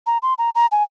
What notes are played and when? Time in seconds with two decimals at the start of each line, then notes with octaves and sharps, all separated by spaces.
0.07 A#5
0.22 C6
0.38 A#5
0.55 A#5
0.72 G#5